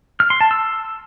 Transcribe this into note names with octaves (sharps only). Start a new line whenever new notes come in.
F6
C6
A5
E6